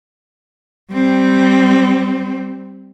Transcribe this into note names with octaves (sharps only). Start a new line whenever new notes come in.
G3 C4